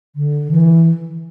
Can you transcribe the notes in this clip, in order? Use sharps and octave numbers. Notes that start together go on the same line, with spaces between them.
D3
E3